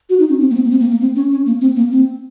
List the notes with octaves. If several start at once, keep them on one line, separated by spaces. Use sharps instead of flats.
F#4
D#4
C#4
C4
A#3
C4
A#3
C4
A#3
A#3
C4
C#4
C#4
A#3
C4
A#3
C4